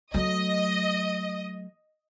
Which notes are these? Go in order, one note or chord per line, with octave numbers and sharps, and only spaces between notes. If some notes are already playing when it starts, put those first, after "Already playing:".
F#3 A3 D#5